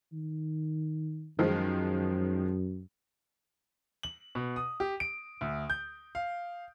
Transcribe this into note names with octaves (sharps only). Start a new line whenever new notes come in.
D#3
F#2 D#3 F3 G#3
F#7
B2
D#6
G4
D7
D2
G6
F5